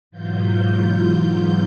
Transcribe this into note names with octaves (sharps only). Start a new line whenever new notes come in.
G#2 B2 E3 F#3 F4 G6